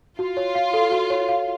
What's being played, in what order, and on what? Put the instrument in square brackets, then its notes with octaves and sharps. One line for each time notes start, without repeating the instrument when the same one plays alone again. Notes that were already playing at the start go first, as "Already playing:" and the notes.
[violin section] F4 [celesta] F#4
[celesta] C#5
F5
A4
F#4
C#5
F5